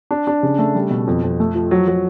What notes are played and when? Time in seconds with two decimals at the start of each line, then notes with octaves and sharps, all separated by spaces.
0.11 D4
0.27 D4
0.43 C#3
0.58 A3
0.75 G3
0.90 B2
1.07 F2
1.23 F2
1.40 A3
1.55 F3
1.71 F#3
1.88 F#3